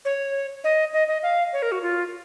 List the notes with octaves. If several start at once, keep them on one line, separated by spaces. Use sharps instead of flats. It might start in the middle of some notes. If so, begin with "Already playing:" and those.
C#5
D#5
D#5
D#5
F5
C#5
A#4
F#4
F4